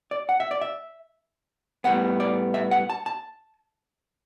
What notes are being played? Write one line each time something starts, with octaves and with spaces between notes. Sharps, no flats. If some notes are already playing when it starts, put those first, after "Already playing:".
D5
F#5
E5
D5
E5
A2 G3 B3 F#5
D5
E5
F#5
A5
A5